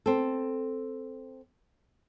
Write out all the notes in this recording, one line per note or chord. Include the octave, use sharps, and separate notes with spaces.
C4 A4